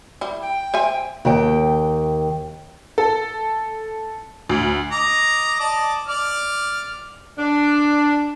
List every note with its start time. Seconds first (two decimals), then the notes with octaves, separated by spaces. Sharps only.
0.21 G3 E4
0.42 G5
0.74 C5 E5 G#5
1.25 D#2 G5
2.98 A4
4.49 D2
4.92 D#5 A#5 D6
5.60 D5 D#5 A5
6.08 D5 F6
7.37 D4